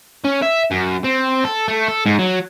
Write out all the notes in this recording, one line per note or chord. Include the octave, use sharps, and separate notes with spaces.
C#4
E5
F#2
C4
A4
A3
A4
G#2
F#3